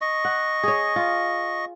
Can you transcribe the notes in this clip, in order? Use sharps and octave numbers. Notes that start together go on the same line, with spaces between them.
D#5 C#6
F#5
G#4 C#5
F4